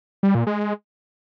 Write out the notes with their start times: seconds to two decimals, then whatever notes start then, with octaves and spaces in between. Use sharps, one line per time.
0.23 G3
0.35 A#2
0.47 G#3